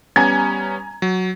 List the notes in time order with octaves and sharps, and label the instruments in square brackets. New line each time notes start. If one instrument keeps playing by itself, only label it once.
[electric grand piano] G3 B3 C#4 [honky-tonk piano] G#5 A#5 G#6
[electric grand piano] F#3